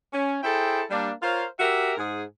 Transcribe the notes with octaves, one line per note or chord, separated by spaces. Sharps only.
C#4
E4 G#4 A4 C5 G5
G3 A#3 D4
F4 A#4 C5 C#5 F5
F#4 G4 A#4 E5
G#2 G#4